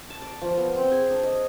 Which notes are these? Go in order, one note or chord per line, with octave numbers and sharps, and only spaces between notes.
A5
D5
F3
B3
C4
G#4
D4
D#5